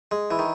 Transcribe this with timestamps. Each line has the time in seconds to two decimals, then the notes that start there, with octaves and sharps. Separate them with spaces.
0.11 G#3
0.31 E3
0.39 D#3